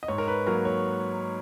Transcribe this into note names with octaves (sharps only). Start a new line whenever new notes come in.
D#5
G#2 C#5
A#4
B4
F#3 A#3 A#4
C#5